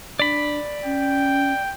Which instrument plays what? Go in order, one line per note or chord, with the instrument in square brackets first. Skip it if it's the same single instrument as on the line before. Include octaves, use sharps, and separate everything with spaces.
[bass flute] D4 [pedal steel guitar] D5 B5
[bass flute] C#4 [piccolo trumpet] G5